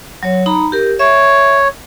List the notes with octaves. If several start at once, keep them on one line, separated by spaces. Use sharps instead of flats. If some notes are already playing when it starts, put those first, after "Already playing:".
F#3 C#5
D#4 A#5 B5
G4 A#4
C#5 E5